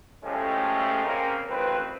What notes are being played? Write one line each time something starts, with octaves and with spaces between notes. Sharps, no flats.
A2 F3 G#3 A3 C#4 G4
C#3 A#3 C4 A#4
A1 D#3 C4 F4 B4